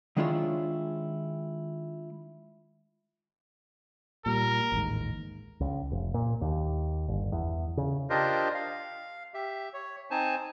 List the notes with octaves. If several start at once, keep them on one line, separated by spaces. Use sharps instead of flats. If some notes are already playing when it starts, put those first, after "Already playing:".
D#3 G#3 D4 E4 F4 C#5
A#2 G3 A#4
A1 D#2 G#2
C#2
F1
A#2
D#2
G1
E2
C#3
D4 F4 G4 A#4 C5 D#5
F5
G4 E5
C#5
C4 D#4 C5 G#5 A5